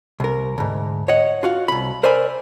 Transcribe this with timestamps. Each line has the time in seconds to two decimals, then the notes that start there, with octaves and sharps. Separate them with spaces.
0.20 C2 A#4
0.58 D2 G#2
1.08 C#5 D#5 F#5
1.43 F4 F#4 F5
1.68 C2 B5
2.03 A#4 C5 D5 E5 G#5 B5